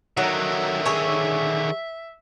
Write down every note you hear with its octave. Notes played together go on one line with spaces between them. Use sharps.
D3 D#3 F#3 E5
G#4 C#5